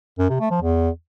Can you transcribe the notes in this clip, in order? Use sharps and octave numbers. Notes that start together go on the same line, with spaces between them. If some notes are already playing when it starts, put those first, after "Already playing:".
F#2
C3
A3
F3
E2